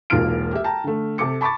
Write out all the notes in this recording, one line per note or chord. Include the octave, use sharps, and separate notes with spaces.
E1 B1 A#3 F4 F6 D7
G4 E5
G5 A5 A#5
D3 A3
C3 A4 D6 C#7
A5 B5 C#6 D6 A6